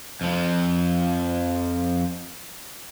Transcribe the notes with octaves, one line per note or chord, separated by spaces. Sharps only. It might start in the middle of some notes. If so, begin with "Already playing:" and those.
F2 F3